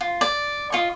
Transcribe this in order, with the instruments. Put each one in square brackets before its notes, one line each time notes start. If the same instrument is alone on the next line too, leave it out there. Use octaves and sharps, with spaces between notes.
[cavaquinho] F4
D5
F4 D#5 C#6